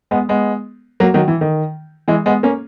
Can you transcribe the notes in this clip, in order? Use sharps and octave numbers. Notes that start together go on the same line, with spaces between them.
G#3 B3
G#3 B3
F#3 A#3
D#3 F#3
E3
D#3
E3 G#3
G#3 B3
A#3 C#4